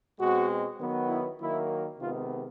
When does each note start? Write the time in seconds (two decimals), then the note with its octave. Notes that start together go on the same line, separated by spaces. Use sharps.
0.19 B2 G#3 C4 F#4
0.79 D#3 F#3 B3
1.09 E4
1.39 D#3 F#3 A#3 E4
1.99 C3 D#3 G#3 B3 F4